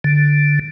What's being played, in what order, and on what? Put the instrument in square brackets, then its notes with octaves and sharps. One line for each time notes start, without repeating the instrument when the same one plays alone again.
[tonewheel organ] D3